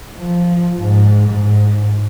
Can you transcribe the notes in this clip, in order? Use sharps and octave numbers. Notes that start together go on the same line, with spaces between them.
F3
G#2
G#2